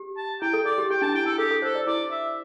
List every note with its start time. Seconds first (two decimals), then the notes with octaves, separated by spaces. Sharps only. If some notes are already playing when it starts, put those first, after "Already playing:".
Already playing: G4
0.17 A5
0.42 E4 G5
0.53 A4
0.66 A4 D5
0.78 G4
0.90 G4 G5
1.02 D4 A5
1.14 E4 G5
1.26 E4 A4
1.38 G4 A4
1.51 A4
1.62 A4 C5
1.75 D5
1.87 E4 D5
2.11 E5